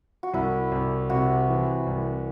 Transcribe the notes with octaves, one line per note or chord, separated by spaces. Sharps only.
F#4
C2 E4
C2
C3 F#4
E3
C2